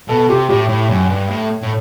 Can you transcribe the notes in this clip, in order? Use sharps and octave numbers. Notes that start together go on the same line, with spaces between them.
B2 A4
C3 G4
A2 G4
A2
F#2
G2
A2
A2